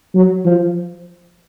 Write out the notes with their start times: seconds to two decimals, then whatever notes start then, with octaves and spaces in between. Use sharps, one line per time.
0.15 F#3
0.45 F3